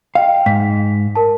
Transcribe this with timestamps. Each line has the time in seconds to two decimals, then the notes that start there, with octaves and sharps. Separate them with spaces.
0.15 D#5 F5 G5
0.46 G#2 B6
1.15 A#4 A5